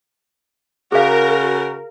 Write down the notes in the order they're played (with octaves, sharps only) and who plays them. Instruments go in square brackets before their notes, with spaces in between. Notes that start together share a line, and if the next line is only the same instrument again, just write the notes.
[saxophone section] C#3 F#4 [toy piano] G#4 F5 [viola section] A#4